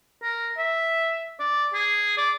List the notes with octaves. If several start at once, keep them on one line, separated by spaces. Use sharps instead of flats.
A#4
E5
D5
G#4
D5